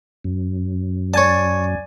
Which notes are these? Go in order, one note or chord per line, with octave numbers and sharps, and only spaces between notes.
F#2
C#5 D5 G#5 A5 G#6